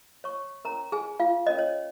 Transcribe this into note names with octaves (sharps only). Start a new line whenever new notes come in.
C#5 C#6
C#4 A#4 C#5 A#5
G#4 G#5
F4 F5
C#4 A#4 C#5 D#5
C#5